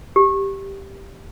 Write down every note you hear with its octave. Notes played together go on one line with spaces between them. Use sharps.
G4